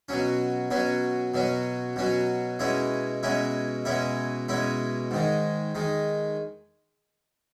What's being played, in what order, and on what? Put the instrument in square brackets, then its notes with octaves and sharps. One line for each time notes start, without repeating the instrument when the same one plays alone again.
[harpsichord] B2 F#3 C#4
B2 F#3 C#4
B2 F#3 C#4
B2 F#3 C#4
B2 G#3 C#4 E4
B2 G#3 C#4 E4
B2 G#3 C#4 E4
B2 G#3 C#4 E4
G#2 D#3 G#3
D#3 G#3